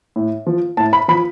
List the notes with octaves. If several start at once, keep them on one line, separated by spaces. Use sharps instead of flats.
A2
F3
A2 A5
B5
F3 B5